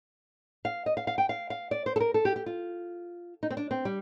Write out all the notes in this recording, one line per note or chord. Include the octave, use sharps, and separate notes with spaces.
F5
D#5
F5
F5
G5
F5
F5
D5
C5
A4
A#4
A4
G4
G4
F4
D#4
C4
D4
C4
G3